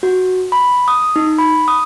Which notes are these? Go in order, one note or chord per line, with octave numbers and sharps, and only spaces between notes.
F#4
B5
D#6
D#4
B5
D#6